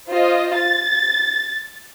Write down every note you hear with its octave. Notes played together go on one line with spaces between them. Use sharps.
F4 C5 D#5
A6